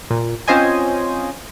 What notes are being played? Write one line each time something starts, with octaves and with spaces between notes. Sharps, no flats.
A#2
C4 C#4 F4 C5 D#5 G#5